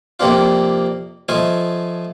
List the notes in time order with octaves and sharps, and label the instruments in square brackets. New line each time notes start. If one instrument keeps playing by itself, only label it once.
[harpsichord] F2 C3 A#3 C4 D4 F4
F3 A3 F4 D#5 G#5